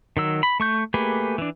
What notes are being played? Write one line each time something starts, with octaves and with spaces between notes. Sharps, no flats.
D#3 F#3 E6
B5
A3 C#6 G6
A3 A#3 G4 G#4 B4
E3 D4